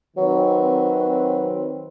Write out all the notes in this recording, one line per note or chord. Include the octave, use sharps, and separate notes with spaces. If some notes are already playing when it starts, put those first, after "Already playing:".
D#3 F#3 C4 B4